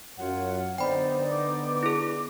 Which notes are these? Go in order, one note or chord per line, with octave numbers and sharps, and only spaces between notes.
F#2 F4 C#5 F#5
D3 B3 D#4 C5 D5 G5 B5
D6
E4 G#4